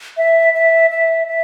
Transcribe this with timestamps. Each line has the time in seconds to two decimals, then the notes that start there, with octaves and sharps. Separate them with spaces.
0.17 E5
0.54 E5
0.91 E5
1.27 E5